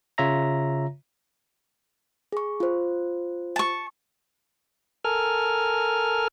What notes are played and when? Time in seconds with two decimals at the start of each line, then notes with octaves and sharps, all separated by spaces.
0.18 C#3 F4 C#5 E5 A#5 A#6
2.32 G#4 C#6
2.60 F4 C5
3.56 A5 C#6
5.05 A4 A#4 G#5 F6